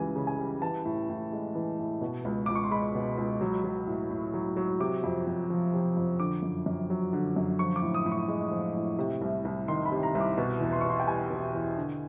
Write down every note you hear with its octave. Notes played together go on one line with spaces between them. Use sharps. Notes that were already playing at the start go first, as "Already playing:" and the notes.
Already playing: C#2 C#3 E3 G3 G#5
C#3
G#5
G3
E3 A5
A2
A2
G#3
E3
A2
B2
C#2
C#2 D6
C#6
C6
G#3 B5
B2
C#2
F#3
F#3
A2
A2
F#3
F#3
C3 D6
F2
F2
F3
C3
F2
D3 D6
F#2
F#2
F#3
D3
F#2
F3 C#6
D6
A2
D#6
A2
C#6
G#3
F3
A2
C3
C2
C2
D#3 C6
B5
C3
A#5
C2
D6
B2
E2
C6
C#6
E2
C6
G5
G3 G#5
B2
E2
D3